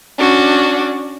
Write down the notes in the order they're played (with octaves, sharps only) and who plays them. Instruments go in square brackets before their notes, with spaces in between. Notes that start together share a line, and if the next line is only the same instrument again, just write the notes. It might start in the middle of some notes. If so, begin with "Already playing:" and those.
[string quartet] C#4 D4 F#4